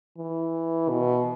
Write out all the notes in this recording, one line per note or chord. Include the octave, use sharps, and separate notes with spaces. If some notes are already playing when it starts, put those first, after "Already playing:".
E3
B2